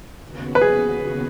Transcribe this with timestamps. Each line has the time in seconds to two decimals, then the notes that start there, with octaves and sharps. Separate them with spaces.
0.23 D#2 C#3 B3 F#4
0.55 B4
0.61 G#4